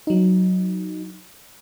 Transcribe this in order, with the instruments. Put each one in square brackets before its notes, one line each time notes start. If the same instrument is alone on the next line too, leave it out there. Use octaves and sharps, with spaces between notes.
[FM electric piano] F#3 D#4